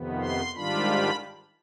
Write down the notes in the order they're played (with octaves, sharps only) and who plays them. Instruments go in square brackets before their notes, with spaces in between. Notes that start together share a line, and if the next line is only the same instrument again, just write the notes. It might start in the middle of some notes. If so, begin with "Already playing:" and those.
Already playing: [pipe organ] F2 C3 D#3 B3
C6
G#2 D#3 G3 D4 F4 B5